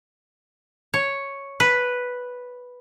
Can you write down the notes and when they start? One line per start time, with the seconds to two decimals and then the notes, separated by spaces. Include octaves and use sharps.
0.94 C#5
1.60 B4